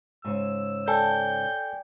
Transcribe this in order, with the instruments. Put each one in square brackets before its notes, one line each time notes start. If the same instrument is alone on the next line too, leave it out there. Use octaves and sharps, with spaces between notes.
[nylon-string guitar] G#2 C#3 [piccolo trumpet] E6
[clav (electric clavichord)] A4 [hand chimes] D5 G5 G#5 [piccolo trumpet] G6